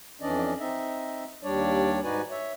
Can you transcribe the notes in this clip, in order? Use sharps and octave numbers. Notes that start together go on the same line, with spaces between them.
F2 E3 C#4 D4 D5 D#5
C4 D#4 D#5 E5
D#2 G3 D4 C#5 D5
G#2 D#4 F#4 B4 D5 G#5
C#5 E5